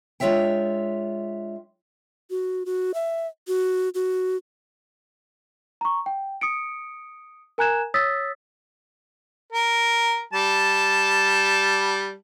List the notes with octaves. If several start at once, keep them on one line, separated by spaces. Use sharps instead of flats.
G#3 D4 F4 C#5 E5 G5
F#4
F#4
E5
F#4
F#4
A#5 C#6
G5
D#6 C#7 D7
A#4 G#5 A#5 F#6 G#6 E7
C#5 D#6 E6 A6 B6
A#4
G3 A5